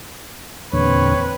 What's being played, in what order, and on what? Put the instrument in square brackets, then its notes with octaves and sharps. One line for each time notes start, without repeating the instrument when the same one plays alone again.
[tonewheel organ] E2 A#2 D3 [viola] C4 B4 [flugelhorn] C#5